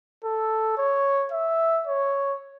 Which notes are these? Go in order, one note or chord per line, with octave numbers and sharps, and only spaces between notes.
A4
C#5
E5
C#5